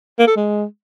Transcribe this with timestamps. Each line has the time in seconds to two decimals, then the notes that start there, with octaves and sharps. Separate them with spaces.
0.19 A#3
0.27 A4
0.36 G#3